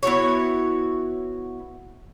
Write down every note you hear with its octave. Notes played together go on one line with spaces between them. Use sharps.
B3 E4 F#4 C#5